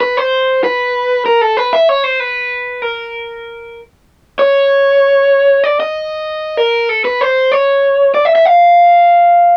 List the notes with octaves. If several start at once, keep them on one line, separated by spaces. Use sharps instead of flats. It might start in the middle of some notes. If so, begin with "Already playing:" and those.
B4
C5
B4
A#4
A4
B4
E5
C#5
C5
B4
A#4
C#5
D5
D#5
A#4
A4
B4
C5
C#5
D5
E5
E5
F5